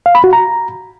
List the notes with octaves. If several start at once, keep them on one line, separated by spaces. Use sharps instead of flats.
F5
B5
F#4
A#5